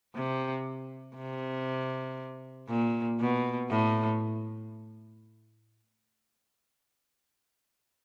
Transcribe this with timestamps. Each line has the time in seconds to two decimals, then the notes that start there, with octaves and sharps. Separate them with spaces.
0.16 C3
1.16 C3
2.68 A#2
3.20 B2
3.70 A2